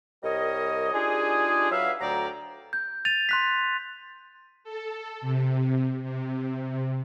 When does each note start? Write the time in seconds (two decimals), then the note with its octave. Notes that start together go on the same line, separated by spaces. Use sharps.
0.24 C2 G3 A#4 C#5 D#5
0.93 D4 D#4 F4 G4 G#4
1.71 F#3 B4 E5 F5
2.01 D2 F#3 A4 D5 G5 A#5
2.73 G6
3.05 A6 D#7 F7
3.29 C6 F#6 B6
4.64 A4
5.21 C3
6.03 C3